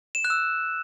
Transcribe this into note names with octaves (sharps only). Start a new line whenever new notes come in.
E7
F#6
E6